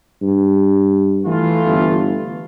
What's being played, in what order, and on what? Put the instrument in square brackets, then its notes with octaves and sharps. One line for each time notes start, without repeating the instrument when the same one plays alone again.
[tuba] G2
[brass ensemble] E3 A3 F4
[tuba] G1